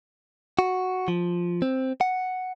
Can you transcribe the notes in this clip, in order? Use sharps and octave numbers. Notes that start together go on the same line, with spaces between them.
F#4
F3
C4
F#5